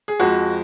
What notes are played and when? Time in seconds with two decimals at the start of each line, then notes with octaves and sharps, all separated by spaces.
0.08 G#4
0.20 F2 F3 G#3 F#4